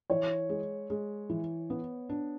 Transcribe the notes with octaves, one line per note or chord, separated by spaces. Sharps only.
E3 C#5
G#3
G#3
E3
B3
D4